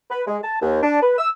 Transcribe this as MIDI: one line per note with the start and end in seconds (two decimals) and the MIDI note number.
0.10 0.22 71
0.27 0.37 56
0.44 0.56 81
0.62 0.80 39
0.83 1.00 62
1.02 1.17 71
1.18 1.29 88